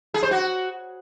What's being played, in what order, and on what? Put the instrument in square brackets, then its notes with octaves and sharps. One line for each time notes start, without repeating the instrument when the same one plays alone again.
[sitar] G#4
C5
F#4